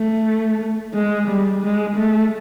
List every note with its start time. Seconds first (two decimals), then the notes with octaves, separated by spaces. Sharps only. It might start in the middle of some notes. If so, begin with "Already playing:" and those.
Already playing: A3
0.93 G#3
1.27 G3
1.62 G#3
1.96 A3